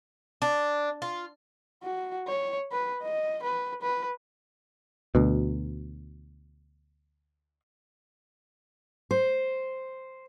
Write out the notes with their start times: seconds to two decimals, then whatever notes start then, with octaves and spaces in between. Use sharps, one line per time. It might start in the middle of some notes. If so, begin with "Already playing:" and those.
0.42 D4
1.02 F4
1.83 F#4
2.27 C#5
2.72 B4
3.03 D#5
3.43 B4
3.82 B4
5.15 D2 B2
9.11 C5